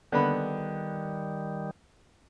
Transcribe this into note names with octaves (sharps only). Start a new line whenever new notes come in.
D3 D#3 G3 B3 B5